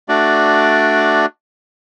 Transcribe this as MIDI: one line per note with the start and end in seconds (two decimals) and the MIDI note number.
0.09 1.26 57
0.09 1.26 62
0.09 1.26 66
0.09 1.26 74